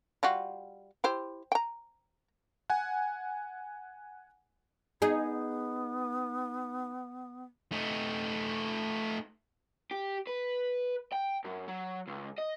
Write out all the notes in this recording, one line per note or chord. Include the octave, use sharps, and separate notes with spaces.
G3 F4 F#4
E4 G4 C5
G5 A#5
F#5 G#5
B3 D#4 G#4
A3 D#4
G4
B4
G5
F#2
F#3
C#2
D#5